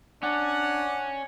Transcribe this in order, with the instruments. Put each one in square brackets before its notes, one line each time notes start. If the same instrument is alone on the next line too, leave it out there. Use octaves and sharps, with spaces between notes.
[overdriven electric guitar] C#4 [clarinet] D4 [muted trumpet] D5 [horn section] F#5